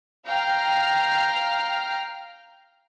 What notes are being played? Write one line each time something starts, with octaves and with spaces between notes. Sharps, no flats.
F5 G5 A#5 F6